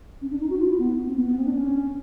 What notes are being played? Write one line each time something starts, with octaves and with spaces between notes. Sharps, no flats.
C#4
D4
D#4
F#4
F4
E4
B3
C4
B3
B3
C4
D4
C#4